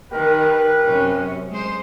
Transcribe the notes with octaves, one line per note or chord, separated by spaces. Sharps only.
D#3 G4 A#4 B4
F#2 C3 C#4
G#3 C5